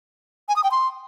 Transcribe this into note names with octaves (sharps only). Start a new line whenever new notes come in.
G#5
D#6
G5
C6